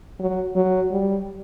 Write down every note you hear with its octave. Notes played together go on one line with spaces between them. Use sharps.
F#3
F#3
G3